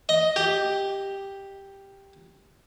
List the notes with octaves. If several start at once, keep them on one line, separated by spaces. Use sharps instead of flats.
D#5
G4